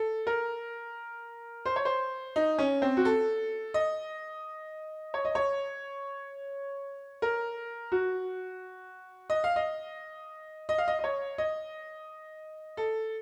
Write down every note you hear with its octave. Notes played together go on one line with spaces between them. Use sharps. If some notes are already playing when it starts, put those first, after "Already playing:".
Already playing: A4
A#4
C5
C#5
C5
D#4
C#4
C4
F#4
A4
D#5
C#5
D#5
C#5
A#4
F#4
D#5
F5
D#5
D#5
F5
D#5
D#5
C#5
D#5
A4